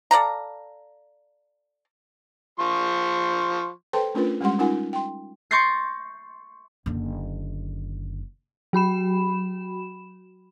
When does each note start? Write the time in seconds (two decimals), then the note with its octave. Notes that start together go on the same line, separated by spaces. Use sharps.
0.11 A4 D5 F5 A#5
2.60 F3 C6 C#6
3.93 A4 B4 C5 G5 A5 C6
4.14 A3 C#4 D4 F4 A#4 B4
4.41 G3 G#3 C#4 G4 F#5 C6
4.59 C#4 D#4 F4 A#4 F#5 G#5
4.93 G5 C6
5.51 C6 C#6 G6 A6 A#6 C7
6.86 F#1 D3
8.73 F#3 F#4 B5 E7